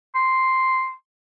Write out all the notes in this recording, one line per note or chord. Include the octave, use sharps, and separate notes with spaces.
C6